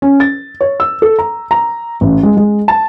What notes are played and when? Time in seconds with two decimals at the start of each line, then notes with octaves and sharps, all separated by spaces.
0.02 C#4
0.20 A6
0.61 C#5
0.80 E6
1.02 A4
1.19 A#5
1.51 A#5
2.01 A1
2.23 G#3
2.37 G#3
2.68 A5